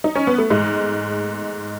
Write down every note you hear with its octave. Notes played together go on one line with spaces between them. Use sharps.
D#4
C#4
B3
A3
G#2 G#3